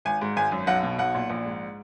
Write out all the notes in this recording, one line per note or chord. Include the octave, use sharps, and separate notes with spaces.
G#1 G#5
G#2
G#1 G#5
F#2
B1 F#5
B2
B1 F#5
A#2
A#1
G#2